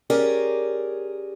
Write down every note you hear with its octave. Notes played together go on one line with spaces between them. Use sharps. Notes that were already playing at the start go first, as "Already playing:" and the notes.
C#4 G4 G#4 A#4 D5